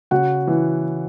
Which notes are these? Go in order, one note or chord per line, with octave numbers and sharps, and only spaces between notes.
C#3 F#4 F#5
E3